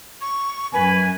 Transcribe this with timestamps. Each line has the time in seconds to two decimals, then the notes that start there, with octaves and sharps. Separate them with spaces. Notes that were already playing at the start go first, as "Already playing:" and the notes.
0.21 C#6
0.73 F#2 B4 G#5